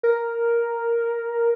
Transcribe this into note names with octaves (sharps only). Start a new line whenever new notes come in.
A#4